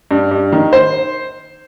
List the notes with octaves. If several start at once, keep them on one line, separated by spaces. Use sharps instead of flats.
G2
G2
D#3
C5